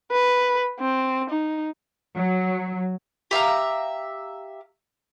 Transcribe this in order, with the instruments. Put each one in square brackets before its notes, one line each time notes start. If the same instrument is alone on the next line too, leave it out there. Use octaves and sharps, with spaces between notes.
[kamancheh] B4
C4
D#4
[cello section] F#3
[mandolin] G4 E5 F5 A#5